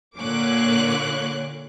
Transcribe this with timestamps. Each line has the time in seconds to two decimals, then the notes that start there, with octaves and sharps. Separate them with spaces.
0.17 A#2 D3 A#3 C#5 D6 F#6